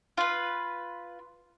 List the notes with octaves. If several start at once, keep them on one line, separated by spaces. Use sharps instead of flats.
F4 B4